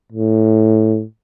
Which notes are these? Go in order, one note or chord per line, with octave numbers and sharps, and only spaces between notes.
A2